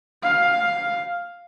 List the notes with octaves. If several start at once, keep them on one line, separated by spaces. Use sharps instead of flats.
F5